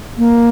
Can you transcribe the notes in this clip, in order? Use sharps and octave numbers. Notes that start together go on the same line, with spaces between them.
A#3